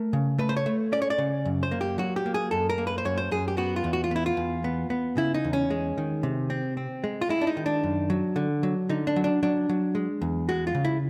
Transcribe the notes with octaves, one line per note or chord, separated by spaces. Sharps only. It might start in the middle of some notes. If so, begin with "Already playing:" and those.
Already playing: A3 A#4
C#3
A3 B4
C5
C#5
A3
C#4 D5
C#5
D5
C#3
F#2
C5
A#3
G4
F#3 F#4
G4
A#3
G#4
F#2 A4
A#4
A#3
B4
C5
F#2 C#5
C5
F#2 G#4
G4
B3 F#4
F4
E2
F#4
F4
B3 E4
F4
E2
B3
B3
C#3 E4
D#4
E2
C#4
G#3
D#3
C3
C4
C4
G#3
F4
G#3 E4
D4
D#4
D#3
D4
F#2
F#3
D3
F#3
D3 D#4
D4
F#3
D4
F#3 D4
F#3
G#3
E2
G#3 F#4
F4
C#3
E4